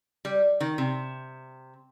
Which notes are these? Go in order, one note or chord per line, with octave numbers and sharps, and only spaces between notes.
G3
D#3
C3